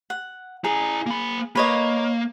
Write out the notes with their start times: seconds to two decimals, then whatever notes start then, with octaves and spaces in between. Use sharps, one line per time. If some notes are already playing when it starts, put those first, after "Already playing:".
0.10 F#5
0.64 E4 G#4 A#5
1.06 A#3 B5
1.55 A#3 B4 C#5 D#5